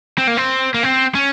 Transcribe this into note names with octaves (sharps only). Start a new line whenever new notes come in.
C4
A#3
C4
A#3
C4
C#4